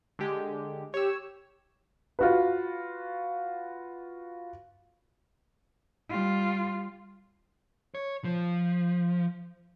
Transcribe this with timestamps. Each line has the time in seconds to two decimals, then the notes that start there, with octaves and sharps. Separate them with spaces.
0.19 D3 G#3 G4
0.94 G4 C#5 E6
2.19 F4 F#4 B4
6.10 G3 F4
7.95 C#5
8.24 F3